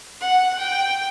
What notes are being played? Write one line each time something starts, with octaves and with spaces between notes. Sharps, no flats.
F#5
G5